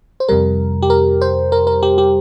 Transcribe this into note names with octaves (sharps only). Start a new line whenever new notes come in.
C5
F2 C3 G3 A#4
G4
A#4
C5
A#4
A#4
G4
G4